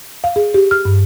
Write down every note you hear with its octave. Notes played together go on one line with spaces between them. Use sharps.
F5
G#4
G4
F6
G2